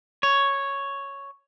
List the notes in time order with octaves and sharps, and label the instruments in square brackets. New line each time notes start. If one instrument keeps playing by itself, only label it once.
[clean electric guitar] C#5